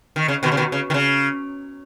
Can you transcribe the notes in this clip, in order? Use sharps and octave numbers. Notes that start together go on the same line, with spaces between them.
D#3
C#3
B2 D#3
C#3
B2 D#3
C#3
D#3
C#3